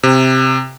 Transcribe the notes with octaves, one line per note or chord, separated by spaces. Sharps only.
C3